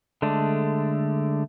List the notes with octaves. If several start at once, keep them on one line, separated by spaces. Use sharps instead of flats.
D3 G#3 A3 D4